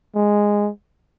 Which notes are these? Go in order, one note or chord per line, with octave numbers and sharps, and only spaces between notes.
G#3